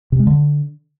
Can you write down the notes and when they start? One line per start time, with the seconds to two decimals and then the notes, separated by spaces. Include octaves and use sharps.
0.12 C3
0.20 G#3
0.27 D3